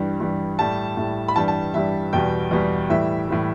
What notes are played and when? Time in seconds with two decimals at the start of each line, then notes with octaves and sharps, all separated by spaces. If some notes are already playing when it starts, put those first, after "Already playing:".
Already playing: G2 E3 G3
0.20 G2 E3 G3
0.58 A2 G3 A5
0.97 A2 G3
1.28 B5
1.36 G2 E3 G3 A5
1.48 A5
1.74 G2 E3 G3 E5
2.13 E2 B2 G3 G5
2.51 E2 B2 G3
2.90 A2 E3 G3 E5
3.28 A2 E3 G3